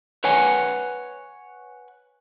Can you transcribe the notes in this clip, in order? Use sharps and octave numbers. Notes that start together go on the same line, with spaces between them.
B4 C#5 F#5 G#5